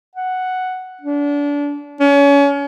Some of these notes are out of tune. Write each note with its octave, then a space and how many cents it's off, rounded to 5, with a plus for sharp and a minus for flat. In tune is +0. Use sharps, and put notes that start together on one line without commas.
F#5 +0
D4 -30
C#4 +30